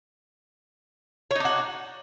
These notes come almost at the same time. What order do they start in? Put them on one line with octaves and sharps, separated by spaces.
C#5 D#4 D4 F#4